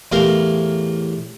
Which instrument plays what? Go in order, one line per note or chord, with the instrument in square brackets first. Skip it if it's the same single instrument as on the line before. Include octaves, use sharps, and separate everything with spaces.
[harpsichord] E2 A2 G4 A#4 F5